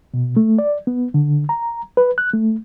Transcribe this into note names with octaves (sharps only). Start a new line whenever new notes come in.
B2
A3
D5
B3
D3
A#5
B4
F#6
A3